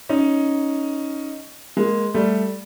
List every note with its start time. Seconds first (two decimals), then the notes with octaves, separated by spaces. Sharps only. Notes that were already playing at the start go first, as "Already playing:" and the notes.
0.09 C#4 D#4
1.77 G#3 A#3
2.14 G3 A3